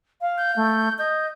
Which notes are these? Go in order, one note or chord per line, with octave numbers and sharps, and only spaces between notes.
F5
G6
A3
D#5 G6